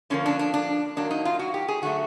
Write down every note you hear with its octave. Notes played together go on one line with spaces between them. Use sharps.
D3 F3 A#3 C#4
D4
D4
D4
D#3 F#3 A#3 D4
D#4
F4
F#4
G4
G#4
D3 F#3 A3 F#4